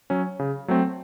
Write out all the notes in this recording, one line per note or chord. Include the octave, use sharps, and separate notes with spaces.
F#3 C#4
C#3
F#3 A3 C4